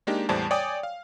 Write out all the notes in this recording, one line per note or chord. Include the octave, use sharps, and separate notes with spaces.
G#3 A#3 D4 D#4 G4
E2 A2 G3 C5 D5 A5
C#5 D5 G5 G#5 D6 D#6
F5